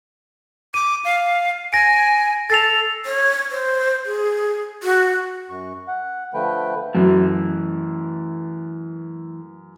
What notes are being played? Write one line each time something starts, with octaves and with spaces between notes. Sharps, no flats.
D6 D#7
F5
G#5 A#6 D7
A4 A6 C7 F7
C#5
C5
G#4
F#4
F#2 C#6
F#5
D3 F3 A3 B4 G5
F#2 E3 A3